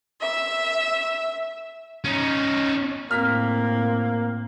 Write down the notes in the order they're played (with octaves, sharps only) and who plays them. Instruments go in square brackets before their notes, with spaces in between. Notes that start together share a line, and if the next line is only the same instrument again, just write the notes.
[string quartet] E5 E6
[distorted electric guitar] C#4 D#4
[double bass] A2 [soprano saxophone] A#3 [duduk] C4 [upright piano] F6 B6